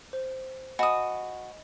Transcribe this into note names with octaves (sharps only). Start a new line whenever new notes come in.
C5
F#4 D#5 G#5 B5 D#6